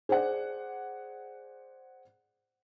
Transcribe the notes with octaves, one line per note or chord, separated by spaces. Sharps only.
G#4 C5 D5 F#5